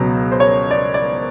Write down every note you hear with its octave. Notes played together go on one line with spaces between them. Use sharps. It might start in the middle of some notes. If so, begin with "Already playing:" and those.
Already playing: C#2 B2 F#3
C5
C#5
D5
D5